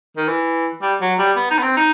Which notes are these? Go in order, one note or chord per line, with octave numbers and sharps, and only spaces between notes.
D#3
E3
G3
F#3
G3
B3
D#4
B3
C4
D#4